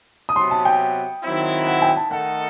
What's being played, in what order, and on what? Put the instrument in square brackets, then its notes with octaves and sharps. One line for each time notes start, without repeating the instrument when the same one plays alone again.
[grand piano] D#6
[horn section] C3 F#3 B3 [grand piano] C6
[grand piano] A5
G5
[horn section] D#3 F#3 C4 E4
[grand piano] F#5
G5
A5
[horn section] D#3 A3 D#4 A4 [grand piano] F#5